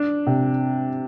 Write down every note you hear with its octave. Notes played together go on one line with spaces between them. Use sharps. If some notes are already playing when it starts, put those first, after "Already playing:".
Already playing: D4
C3